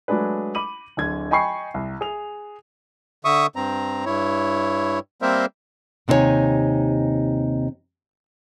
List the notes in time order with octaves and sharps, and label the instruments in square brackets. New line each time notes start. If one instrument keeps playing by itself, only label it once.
[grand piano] F#3 G#3 A3 D4 G#4 B4
B5 D6 D#7 F#7
D1 D3 G#6
D#5 G5 G#5 B5 C#6 C7
C2
G#4 F7
[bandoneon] D3 E5 C#6 D#6
G2 C4 A#5
G2 E4 C#5
G3 A#3 C4 A#4 C5 E5
[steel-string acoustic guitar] D#2 C3 D#4 A4 C#5 G#5